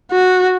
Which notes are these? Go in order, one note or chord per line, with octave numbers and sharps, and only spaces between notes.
F#4